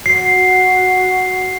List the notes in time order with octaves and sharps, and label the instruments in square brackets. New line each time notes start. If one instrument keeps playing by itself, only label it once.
[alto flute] F#4 [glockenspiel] C7